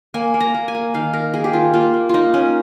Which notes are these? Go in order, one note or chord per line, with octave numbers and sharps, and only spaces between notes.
A#3 G#5
A#3
A#5
A#3
G#5
A#3
D#3 F5
A#3 A#4
A#3 G#4
G4
D#3 F4
A#3 F4
A#3
A#3 D#4 F4
A#3 C#4